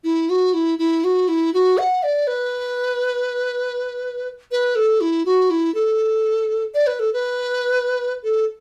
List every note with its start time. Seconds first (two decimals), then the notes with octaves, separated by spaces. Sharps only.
0.04 E4
0.30 F#4
0.54 E4
0.79 E4
1.04 F#4
1.28 E4
1.54 F#4
1.78 F#5
2.03 D5
2.27 B4
4.51 B4
4.76 A4
5.01 E4
5.26 F#4
5.50 E4
5.75 A4
6.75 D5
6.87 B4
7.00 A4
7.13 B4
8.24 A4